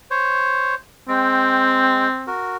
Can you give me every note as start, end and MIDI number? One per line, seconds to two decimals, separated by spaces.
0.11 0.75 72
0.11 0.75 73
1.08 2.08 56
1.08 2.30 60
1.08 2.08 79
2.27 2.57 66
2.27 2.57 70